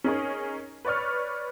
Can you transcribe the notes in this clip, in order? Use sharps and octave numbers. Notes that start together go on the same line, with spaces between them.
C#4 D#4 G#4 A#4 C#5
B4 C#5 D5 C#6 F6